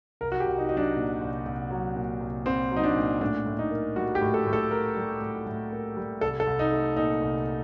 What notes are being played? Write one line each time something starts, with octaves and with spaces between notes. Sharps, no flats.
C2 A#4
F#4
G4
C2
D#4
F#3 D#4
D4
A#2
C2
C2
F#3
A#2
C2
C2 C4
F#3
D#4
D4
A#2
A2 D4
A2
D#4
A#3
G3 F#4
G4
A2
A4
A2
A4
A#3 A#4
G3
A2
A2
A#3
G3
C2 A4
A4
C2
D#4
A3
A#2 D#4
C2